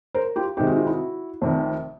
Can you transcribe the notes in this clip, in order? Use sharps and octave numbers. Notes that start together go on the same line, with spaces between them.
A#4 C5
F4 G4
C3 D#3 G#3 C4 D#4 G4
F#4
F4
E4 F#4
F1 F2 C3 D#3